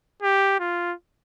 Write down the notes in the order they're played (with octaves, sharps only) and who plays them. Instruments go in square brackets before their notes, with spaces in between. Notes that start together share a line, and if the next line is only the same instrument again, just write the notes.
[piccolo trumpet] G4
F4